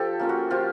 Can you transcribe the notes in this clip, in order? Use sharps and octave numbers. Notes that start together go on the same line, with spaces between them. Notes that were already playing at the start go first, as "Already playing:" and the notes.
Already playing: F3 G4 A4
A#3 C#4 F4
F#4
F3 F4 G4